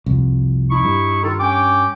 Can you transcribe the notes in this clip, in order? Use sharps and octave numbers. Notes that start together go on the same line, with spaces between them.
C2 F2
D#4 E4 C#6
G2
D#3 F4 A4
C#4 G5 D6